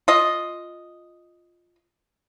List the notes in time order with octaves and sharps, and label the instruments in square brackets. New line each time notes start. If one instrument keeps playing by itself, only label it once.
[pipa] F4 D#5